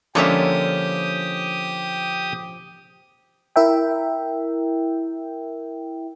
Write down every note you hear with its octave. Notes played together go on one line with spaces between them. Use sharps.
D3 F3 G#3 A#3 C#4 G4 E5 D#6
E4 A#4 E5 G5